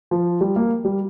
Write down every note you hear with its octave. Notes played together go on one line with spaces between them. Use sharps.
F3
G3
A#3
G3